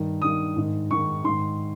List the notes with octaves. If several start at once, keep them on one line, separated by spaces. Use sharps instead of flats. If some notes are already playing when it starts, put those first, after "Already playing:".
Already playing: G2 D#3
G2 D#3 D#6
G#2 D#3
G#2 D#3 C#6
G#2 D#3 C6